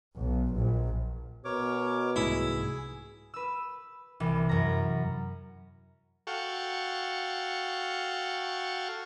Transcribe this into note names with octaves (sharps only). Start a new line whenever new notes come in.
B1
A#1
B2 A#4 C#5 D6
C2 G#2 A3 E4 G#4
B4 E6
C2 E3
F#2 A#5
F#4 A4 F5 G5 C#6